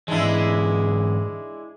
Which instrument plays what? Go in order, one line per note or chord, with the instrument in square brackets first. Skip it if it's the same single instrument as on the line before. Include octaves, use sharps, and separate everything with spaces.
[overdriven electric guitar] G#2 E3 [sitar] G#3 D4 E4